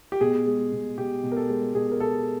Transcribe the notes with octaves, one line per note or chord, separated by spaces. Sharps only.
G4
B2 G#4
G#3
B2
B2 G4
B2
A#4
A4
G#3
B2 G#4
A#4
B2 A4